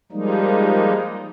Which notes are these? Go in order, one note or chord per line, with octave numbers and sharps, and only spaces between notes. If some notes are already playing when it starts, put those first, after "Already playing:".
F3 G3 G#3 A#3 D#4